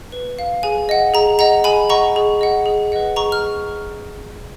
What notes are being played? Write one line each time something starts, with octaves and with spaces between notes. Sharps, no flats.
B4
F5
G#4 G#5
D#5 F#5
G#4 A#5
D#5 F#5 A#5
G#4 G#5 B5
D#5 F#5 A#5 C#6
G#4
D#5 F#5
G#4
B4 D#5 F#5
G#4 A#5 C#6
F6